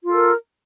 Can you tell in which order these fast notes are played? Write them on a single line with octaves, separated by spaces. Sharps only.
F4 A4 A#4